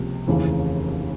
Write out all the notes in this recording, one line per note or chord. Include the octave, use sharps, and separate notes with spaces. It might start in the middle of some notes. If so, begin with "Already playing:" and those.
Already playing: C#2 C3 F3 A#3
F1 D#2 C#3 E3